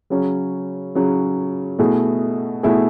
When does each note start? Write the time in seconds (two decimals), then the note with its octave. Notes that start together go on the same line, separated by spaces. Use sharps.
0.10 C#3 F#3 C#4
0.95 C#3 F#3 C#4
1.79 B2 A3 E4 G#4
2.63 B2 A3 E4 G#4